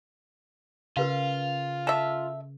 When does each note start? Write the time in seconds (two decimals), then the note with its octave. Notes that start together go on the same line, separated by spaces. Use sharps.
0.97 C#3 F4 A#4 B4 F5
1.87 A4 E5